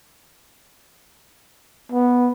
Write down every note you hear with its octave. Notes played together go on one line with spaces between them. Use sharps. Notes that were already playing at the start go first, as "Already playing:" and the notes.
B3